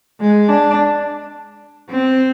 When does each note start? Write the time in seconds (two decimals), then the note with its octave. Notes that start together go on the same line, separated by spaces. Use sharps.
0.20 G#3
0.48 D4
1.90 C4